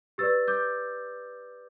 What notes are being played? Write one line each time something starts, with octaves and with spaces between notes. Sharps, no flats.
G4 B4 D5 E6 A6
D6 G6